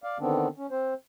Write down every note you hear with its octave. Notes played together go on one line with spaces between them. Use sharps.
D5 F5
D3 D#3 B3 C4 D4
C#4
C4 C5